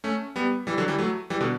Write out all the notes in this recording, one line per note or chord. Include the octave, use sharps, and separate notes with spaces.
A3 C#4
G3 B3
E3 G3
D3 F#3
E3 G3
F#3 A3
E3 G3
B2 D3